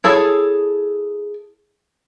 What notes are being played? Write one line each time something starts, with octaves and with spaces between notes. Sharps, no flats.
E4 G#4 A4 C#5